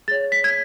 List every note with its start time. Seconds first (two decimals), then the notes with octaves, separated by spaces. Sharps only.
0.08 G#4 C#5 A6
0.32 B6
0.44 G#6